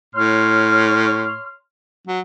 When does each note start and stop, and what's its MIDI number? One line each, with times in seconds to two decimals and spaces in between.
0.15 1.36 45
0.15 1.55 73
0.15 1.55 84
0.15 1.55 89
2.08 2.20 54